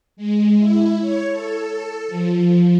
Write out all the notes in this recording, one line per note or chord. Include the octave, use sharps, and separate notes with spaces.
G#3
E4
C#5
A4
F3